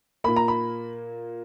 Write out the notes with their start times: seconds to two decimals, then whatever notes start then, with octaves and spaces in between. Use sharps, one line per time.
0.24 A#2 A#3 B5
0.36 A#5
0.48 B5